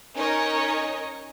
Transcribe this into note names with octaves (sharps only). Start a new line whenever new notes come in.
C#4 D#4 A#4 C#5 D#5